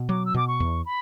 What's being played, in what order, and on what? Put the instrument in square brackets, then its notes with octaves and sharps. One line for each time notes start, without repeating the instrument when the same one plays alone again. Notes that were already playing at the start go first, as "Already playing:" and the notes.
Already playing: [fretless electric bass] B2
[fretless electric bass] F#3 [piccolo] D6
[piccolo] E6
[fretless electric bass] B2 [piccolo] D6
[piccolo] C#6
[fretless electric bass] E2
[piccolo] B5